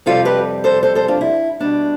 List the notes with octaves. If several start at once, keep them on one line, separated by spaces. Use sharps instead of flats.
F2 C3 G3 C4 F4 A4
G4 B4
A4 C5
A4 C5
A4 C5
D4 F4
E4
B2 G3 B3 D4